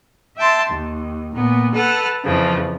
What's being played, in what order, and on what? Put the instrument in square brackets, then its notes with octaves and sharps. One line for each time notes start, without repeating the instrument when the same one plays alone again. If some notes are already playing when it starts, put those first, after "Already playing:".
[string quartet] E5 G5 A5 C6
D#2
A#2 B3
A4 B4 F#5 A5 F6
F2 C#3 E3 F3